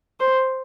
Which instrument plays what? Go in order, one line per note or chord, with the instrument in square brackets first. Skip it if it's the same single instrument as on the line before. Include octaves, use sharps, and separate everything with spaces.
[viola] C5